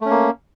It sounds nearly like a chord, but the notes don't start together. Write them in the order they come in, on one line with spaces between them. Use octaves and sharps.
A3 C#4 A#3